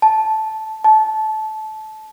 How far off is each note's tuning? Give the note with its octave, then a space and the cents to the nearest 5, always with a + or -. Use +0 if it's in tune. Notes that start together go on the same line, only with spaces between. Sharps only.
A5 -10
A5 -20